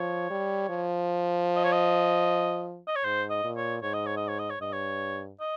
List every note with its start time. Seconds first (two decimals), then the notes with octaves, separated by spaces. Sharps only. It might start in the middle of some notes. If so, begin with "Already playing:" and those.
Already playing: F3 C#5
0.30 G3
0.69 F3
1.56 D#5
1.64 C#5
1.72 D#5
2.88 D#5
2.96 C#5
3.05 G#2 C5
3.30 D#5
3.44 A#2
3.57 C#5
3.82 G#2 C#5
3.94 D#5
4.06 C#5
4.17 D#5
4.28 C#5
4.39 D#5
4.50 C#5
4.61 G2 D#5
4.72 C#5
5.40 D#5